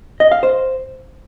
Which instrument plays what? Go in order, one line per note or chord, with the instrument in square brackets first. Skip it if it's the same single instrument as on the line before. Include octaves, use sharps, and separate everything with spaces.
[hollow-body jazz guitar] D#5
F5
C5